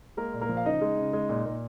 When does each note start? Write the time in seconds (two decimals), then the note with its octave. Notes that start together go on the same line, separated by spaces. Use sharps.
0.17 G#3 A#3 A#4
0.33 A#2
0.41 A#3 A#4
0.49 F3
0.57 F5
0.65 C#3 D#4 D#5
0.81 G#3
0.97 C#3
1.13 G#3
1.29 A#2
1.45 A#2